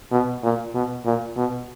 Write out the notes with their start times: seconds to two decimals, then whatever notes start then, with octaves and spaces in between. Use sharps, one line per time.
0.11 B2
0.43 A#2
0.74 B2
1.05 A#2
1.37 B2